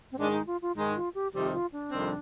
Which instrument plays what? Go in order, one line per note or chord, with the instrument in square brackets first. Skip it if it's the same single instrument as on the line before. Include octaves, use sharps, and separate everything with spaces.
[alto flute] C4
[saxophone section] G#2 D#3 G#3 [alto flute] D4
[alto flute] D#4
F4
F4
[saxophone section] G#2 D#3 G#3 [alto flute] D#4
[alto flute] F4
G4
[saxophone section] F2 C3 D#3 G3 C4 [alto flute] G4
[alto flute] F4
D4
[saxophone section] F2 C3 D#3 G3 C4